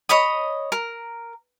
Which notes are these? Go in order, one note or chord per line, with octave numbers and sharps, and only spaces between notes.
C#5 D#5 B5 D#6
A#4